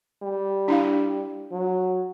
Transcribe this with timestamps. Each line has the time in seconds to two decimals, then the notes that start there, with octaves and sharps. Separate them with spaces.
0.23 G3
0.68 D4 E4 F5
1.52 F#3